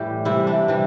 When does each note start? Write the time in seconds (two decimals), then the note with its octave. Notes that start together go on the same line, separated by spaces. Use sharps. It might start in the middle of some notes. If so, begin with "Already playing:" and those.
Already playing: A2 E3 G3 G4
0.25 C3 E3 G3 E4
0.47 D4
0.68 C3 E3 G3